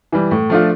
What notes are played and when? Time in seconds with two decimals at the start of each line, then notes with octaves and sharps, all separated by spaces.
0.12 E3 G3
0.31 A2
0.50 F3 A3 D4 F4